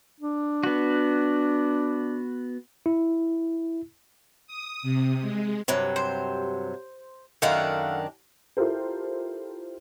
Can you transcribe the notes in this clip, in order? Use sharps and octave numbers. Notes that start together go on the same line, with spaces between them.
D4
B3 F#4
E4
D#6
C3
G#3
G2 C3 F#3
C5
F#2 D#3 A3 D4 F5 F#5
E4 F4 G4 A4 A#4 C5